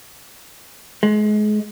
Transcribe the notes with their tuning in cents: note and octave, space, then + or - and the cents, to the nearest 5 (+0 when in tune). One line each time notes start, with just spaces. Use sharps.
G#3 +30